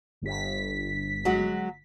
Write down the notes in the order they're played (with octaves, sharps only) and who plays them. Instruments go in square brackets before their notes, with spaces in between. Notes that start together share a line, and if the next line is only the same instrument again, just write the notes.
[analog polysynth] G1 B6
[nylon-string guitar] F#3 G#3 F#4